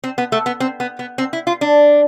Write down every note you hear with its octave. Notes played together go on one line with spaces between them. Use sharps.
C4
B3
A3
B3
C4
B3
B3
C4
E4
F4
D4